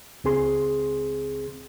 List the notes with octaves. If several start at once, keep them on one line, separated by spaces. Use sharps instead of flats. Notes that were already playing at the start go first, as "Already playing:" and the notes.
C#2 C4 G#4 C6